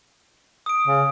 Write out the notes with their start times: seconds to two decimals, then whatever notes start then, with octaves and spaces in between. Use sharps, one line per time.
0.66 D#6 D7
0.87 C#3